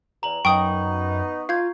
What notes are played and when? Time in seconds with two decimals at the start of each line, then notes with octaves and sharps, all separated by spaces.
0.23 E2 A#5 F#7
0.45 F#2 B3 D#4 G5 C#6 D#6
1.49 F4 F5 G6 G#6